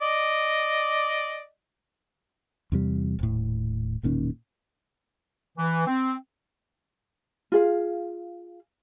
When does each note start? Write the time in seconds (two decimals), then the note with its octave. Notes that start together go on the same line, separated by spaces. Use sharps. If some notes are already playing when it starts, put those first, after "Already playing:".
0.02 D5 D#5
2.72 E2 C3 G3
3.19 D#1 A2
4.03 E1 A#2 D#3 C#4
5.58 E3
5.87 C4
7.52 F4 G#4 F5